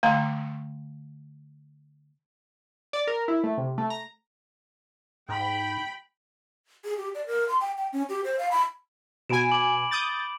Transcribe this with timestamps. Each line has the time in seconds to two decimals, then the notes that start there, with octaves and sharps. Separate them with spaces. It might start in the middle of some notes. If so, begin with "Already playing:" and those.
0.03 D3 A3 F5 A#5
2.93 D5
3.07 A#4
3.28 E4
3.44 A3
3.58 C3
3.78 A3
3.90 A#5
5.29 G#2 G5 B5
6.84 G#4
6.97 G4
7.15 D5
7.26 A#4
7.49 C6
7.60 G5
7.77 G5
7.93 C#4
8.09 G4
8.24 C5
8.39 F5
8.51 B5
9.29 B2 G#5 B5 D7 E7
9.52 B5 D6 F#7
9.91 D#6 G6 A6 F#7